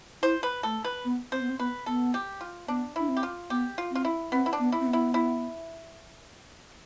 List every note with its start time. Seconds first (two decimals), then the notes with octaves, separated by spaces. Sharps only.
0.22 E4 C5
0.43 B4
0.63 A3 A4
0.85 B4
1.05 B3
1.32 C4 C5
1.41 B3
1.49 C4
1.59 B3 B4
1.86 B3 A4
2.14 G4
2.41 F4
2.68 B3 D4
2.96 D4 E4
3.09 C4
3.17 G4
3.23 F4
3.50 B3 G4
3.78 F4
3.91 C4 F4
4.05 E4
4.32 B3 C4
4.46 E4
4.53 D4
4.59 B3
4.72 E4
4.80 C4
4.87 B3
4.93 E4
5.14 E4